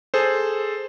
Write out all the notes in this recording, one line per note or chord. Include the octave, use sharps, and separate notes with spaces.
G#4 A4 C5